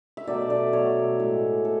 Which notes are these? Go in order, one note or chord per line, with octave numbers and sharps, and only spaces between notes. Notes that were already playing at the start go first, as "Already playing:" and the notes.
E5
B2 F#3 A3 D5
D5
B2 F#3 A3 C#5
A2 G#3
A2 A4